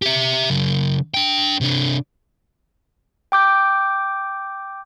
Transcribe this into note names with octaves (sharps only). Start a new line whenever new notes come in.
G4 E5
C#3 F#3
D4 G5
C3 D4
G5 D6 G6